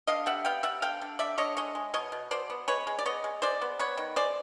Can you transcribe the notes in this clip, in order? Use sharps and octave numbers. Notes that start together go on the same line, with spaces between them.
D3 D#5 F5
G3 E5 F#5
B3 F5 G5
G3 E5 F#5
D3 F5 G5
D3
D3 D5 E5
D3 C#5 D#5
G#3 C#5 D#5
G#3
B2 C#5 D#5
B2
B2 C5 D5
B3
G#3 B4 C#5
G#3
D5
B3 C#5 D#5
G#3
G#3 C5 D5
B3
B3 B4 C#5
D#3
G#3 C5 D5